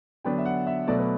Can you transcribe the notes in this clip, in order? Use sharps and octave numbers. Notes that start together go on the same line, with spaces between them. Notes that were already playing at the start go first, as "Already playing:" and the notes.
D3 F#3 B3 D4 G5
E5
F#5
E5
B2 F#3 A3 D5
B4